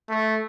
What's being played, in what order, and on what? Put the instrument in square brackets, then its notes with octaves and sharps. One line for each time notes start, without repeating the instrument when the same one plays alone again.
[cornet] A3